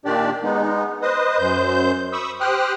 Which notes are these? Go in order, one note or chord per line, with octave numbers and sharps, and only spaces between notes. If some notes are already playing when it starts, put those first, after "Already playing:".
A#2 D#3 D4 G4 D5
G#3 B3 D#4
B4 C5 D#5 D#6
F#2 C5 G6
B5 C#6 D#6 E6
G4 C5 G5 D#6 F6 F#6